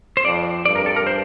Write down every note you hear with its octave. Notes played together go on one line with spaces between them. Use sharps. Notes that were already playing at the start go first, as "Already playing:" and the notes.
C5
F2 D5
G2 D5
A#4
A4
A#4
C5